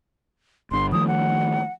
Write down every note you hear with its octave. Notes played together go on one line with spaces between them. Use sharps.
G1 D3 C6
D#3 F3 A3 D#6
F#5